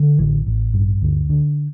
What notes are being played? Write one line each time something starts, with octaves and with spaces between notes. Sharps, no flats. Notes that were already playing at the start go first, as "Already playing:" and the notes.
Already playing: D3
A1 E3
A1
G2
D2
D3